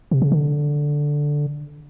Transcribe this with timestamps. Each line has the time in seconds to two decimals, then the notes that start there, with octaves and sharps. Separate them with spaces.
0.11 C3
0.22 C#3
0.32 D3